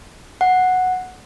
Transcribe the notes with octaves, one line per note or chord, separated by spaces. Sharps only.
F#5